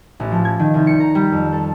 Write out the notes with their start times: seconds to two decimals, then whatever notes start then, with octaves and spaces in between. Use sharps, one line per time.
0.20 A1
0.31 F3
0.45 G#6
0.59 D#3
0.74 C2
0.87 C#7
1.00 A#5
1.15 G3
1.32 F2
1.53 A4